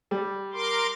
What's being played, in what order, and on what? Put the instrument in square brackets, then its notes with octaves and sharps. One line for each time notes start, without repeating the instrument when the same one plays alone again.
[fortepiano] G3
[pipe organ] A#4 C6 D6